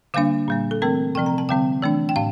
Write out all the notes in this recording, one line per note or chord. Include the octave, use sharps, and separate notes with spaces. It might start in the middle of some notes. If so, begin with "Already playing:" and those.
D3 G3 A#3 D4 F5
A#2 G3 A#3
A4
E3 A3 C4 A#4
C3 F3 C4 G5
A#5
A5
D3 G3 C4 G5
E3 A3 D4
G5
A2 F5